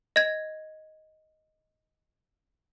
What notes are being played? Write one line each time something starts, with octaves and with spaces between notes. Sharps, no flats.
D#5 G#6